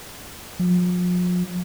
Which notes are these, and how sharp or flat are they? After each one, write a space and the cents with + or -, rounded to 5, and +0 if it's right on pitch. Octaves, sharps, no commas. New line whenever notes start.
F3 +40